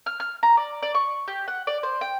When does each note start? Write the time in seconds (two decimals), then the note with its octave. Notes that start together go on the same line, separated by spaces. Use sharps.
0.06 F6
0.20 F6
0.43 A#5
0.57 D5
0.82 D5
0.94 C#6
1.28 G4
1.48 F#5
1.67 D5
1.83 C5
2.01 G5